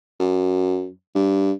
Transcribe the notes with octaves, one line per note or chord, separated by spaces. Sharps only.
F#2
G2